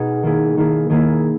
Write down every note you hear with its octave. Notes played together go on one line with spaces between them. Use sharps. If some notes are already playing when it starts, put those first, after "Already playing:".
Already playing: B2 D#4 G#4
D#3 A#3 E4 G#4
D#3 A#3 E4 G#4
D#3 A#3 E4 G#4